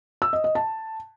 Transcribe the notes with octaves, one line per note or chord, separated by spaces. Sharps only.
E6
D#5
D#5
A5